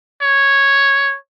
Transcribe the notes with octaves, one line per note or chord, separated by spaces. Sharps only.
C#5